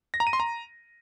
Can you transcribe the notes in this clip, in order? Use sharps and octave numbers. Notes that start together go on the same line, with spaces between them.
A#6
A#5
D#7
C6
A#5